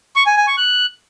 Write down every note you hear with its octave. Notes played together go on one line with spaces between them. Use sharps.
C#6
G#5
G#5
C#6
F#6